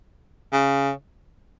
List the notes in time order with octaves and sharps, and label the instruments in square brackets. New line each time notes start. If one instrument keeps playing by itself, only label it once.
[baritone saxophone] C#3